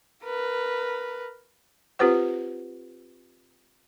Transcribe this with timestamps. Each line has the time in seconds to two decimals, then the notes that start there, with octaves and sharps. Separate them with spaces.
0.24 A#4 B4
1.99 C4 F4 G4 B4 C5 F#5